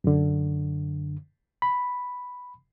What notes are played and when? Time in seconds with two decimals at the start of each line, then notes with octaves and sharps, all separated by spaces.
0.04 F#2 D3
1.62 B5